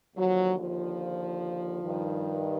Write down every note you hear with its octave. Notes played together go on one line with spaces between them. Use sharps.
D#2 D3 F3 F#3
F3
G2 D#3